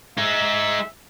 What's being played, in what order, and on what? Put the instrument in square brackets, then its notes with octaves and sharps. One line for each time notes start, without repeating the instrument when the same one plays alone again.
[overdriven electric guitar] G#3 D#4 [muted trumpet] E5